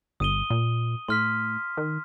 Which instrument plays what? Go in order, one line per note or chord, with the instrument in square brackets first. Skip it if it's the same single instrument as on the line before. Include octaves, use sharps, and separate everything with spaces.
[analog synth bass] G1 [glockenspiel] D#6 D#7 G7
[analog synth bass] A#2
[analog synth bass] A2 [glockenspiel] C6 F6 B6
[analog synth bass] D#3